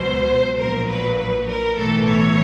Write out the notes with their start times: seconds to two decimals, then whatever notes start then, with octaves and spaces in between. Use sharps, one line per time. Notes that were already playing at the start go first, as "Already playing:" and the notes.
Already playing: C#2 B2 F#3 C5
0.58 A#1 A#2 F#3 A#4
0.88 B4
1.18 B4
1.47 A#4
1.77 B1 A2 E3 A4
2.07 C#5